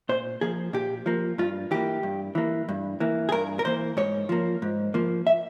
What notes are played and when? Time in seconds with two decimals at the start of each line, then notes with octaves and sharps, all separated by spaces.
0.09 A#2 C5
0.41 F3 A#3 G#4
0.73 A#2 G4
1.06 F3 A#3
1.38 G2 F4
1.71 E3 A#3 G4
2.03 G2
2.35 E3 A#3
2.69 G2
3.00 E3 A#3
3.29 G#4
3.32 G2 A#4
3.59 A#4
3.65 E3 A#3 C5
3.97 G#2 C#5
4.29 F3 A#3
4.62 G#2
4.94 F3 A#3
5.27 E5